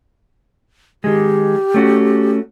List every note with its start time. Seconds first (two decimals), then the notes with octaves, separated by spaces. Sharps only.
1.04 D#3 G#3 G4
1.74 A3 C#4 F#4